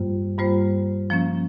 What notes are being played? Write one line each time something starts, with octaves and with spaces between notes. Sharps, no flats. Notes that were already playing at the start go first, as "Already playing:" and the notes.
Already playing: G2 G3 A#3 F4 C5
G2 G3 A#3 F4 C5
F3 A#3 C#4